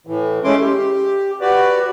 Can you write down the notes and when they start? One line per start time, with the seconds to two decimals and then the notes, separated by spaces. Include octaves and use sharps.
0.07 A2 E3
0.44 G#3 A3 C#4 E4 C6 D6
0.60 G4
1.41 F#4 G4 B4 D5